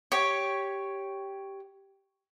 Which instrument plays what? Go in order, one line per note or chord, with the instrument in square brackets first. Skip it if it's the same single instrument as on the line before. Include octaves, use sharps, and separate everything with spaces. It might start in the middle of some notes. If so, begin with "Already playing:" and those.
[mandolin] G4 C#5